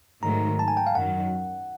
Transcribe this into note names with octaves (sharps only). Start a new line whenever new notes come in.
G#2 D#3 F#3 A3 A#5
A5
G#5
G5
F5
F#2 D#3 F#3 F#5